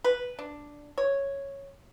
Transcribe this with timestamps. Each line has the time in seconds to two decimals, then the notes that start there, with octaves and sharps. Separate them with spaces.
0.04 B4
0.39 D4
0.98 C#5